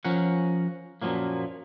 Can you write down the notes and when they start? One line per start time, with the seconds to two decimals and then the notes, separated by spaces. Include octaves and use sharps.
0.05 F3 C#4 A#4 F#5
1.02 F#2 A#2 C#3 F3 F#3 A#3